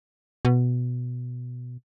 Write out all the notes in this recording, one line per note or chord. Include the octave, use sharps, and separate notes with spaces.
B2